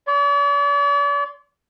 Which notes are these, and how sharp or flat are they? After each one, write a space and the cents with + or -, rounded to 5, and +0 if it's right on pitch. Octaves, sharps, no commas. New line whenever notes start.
D5 -45 C6 +0